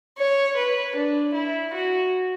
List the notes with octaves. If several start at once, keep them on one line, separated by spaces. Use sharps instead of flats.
C#5
B4
D4
E4
F#4